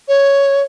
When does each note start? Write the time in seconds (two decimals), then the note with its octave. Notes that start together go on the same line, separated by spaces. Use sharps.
0.08 C#5